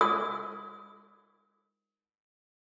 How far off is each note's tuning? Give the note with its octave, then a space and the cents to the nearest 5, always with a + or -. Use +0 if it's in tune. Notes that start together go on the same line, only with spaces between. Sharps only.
D#6 +35